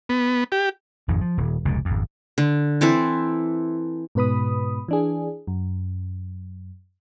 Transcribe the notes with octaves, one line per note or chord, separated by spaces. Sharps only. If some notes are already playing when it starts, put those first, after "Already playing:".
B3
G4
G#1 F2 G#2
F3
D#1
F1 C#2 A#2
G#1 F2
D3
E3 C4 A4 E5
G#2 B2 B4 B5 D#6
E3 D4 G#4
F#2